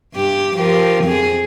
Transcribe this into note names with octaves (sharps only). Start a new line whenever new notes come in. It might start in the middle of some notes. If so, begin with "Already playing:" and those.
G2 G4
F3 G4 A#4
F2 C4 G#4